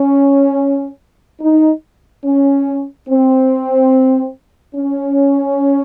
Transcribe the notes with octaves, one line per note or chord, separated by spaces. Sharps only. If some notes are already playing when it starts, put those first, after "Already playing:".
Already playing: C#4
D#4
C#4
C4
C#4